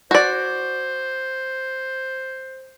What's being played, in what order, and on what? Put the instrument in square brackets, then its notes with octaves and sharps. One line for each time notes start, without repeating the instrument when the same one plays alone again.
[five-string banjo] F#4 D5 [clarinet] C5